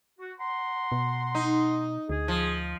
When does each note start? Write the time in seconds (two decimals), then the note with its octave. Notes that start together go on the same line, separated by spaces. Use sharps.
0.19 F#4
0.39 F#5 A#5 C6
0.92 B2
1.35 D#4
2.09 D2 G#4
2.28 F3